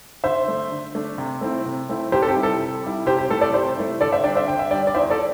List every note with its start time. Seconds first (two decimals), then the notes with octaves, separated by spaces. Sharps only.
0.24 D3 C5 E5
0.48 A3 D4
0.71 D3
0.95 A3 D4
1.18 C3
1.41 A3 C4 E4
1.66 C3
1.89 A3 C4 E4
2.12 C3 G4 C5
2.22 A4
2.28 G4
2.35 G3 E4
2.43 A4
2.60 C3
2.83 G3 E4
3.06 C3 G4 C5
3.18 G4
3.30 A3 E4 A4
3.41 A4 D5
3.53 C3 G4 C5
3.77 A3 E4
4.01 D3 A4 D5
4.12 C5 E5
4.24 G3 D4 D5 G5
4.35 C5 E5
4.48 D3 G5
4.59 E5
4.71 G3 D4 D5 G5
4.87 D5
4.95 E2 C5 E5
5.10 A4 D5